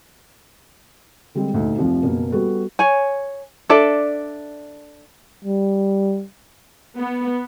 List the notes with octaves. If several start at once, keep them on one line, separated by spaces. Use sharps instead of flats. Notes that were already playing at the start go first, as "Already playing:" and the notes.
D3 G3 G#3 C4
D#1 D2 D#4
F1 C2 C3 F3
F#1 B2 A#3
G3 B3 F#4 A4
C#5 G#5
D4 A4 D5 E5
G3
B3